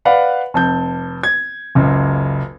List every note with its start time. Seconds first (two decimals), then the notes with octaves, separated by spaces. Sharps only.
0.05 B4 D5 F5 F#5 B5
0.54 F1 A5 G6
1.23 G#6
1.75 F#1 C#2